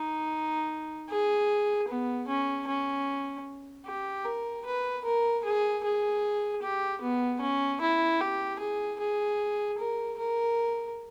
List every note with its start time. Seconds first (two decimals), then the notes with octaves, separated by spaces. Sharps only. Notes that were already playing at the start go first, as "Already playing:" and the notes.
Already playing: D#4
1.10 G#4
1.88 B3
2.28 C#4
2.68 C#4
3.86 G4
4.25 A#4
4.66 B4
5.05 A#4
5.45 G#4
5.84 G#4
6.62 G4
7.02 B3
7.41 C#4
7.82 E4
8.21 G4
8.60 G#4
9.00 G#4
9.79 A#4
10.19 A#4